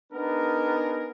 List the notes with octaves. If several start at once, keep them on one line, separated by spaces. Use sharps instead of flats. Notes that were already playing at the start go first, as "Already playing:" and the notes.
B3 D4 D#4 G#4 A#4